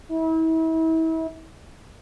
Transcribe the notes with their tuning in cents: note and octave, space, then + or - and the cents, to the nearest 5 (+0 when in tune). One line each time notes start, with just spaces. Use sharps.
E4 -35